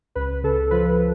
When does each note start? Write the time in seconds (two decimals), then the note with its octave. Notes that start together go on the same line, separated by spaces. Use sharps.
0.15 C#2 B4
0.43 C#3 A4
0.71 F3 B4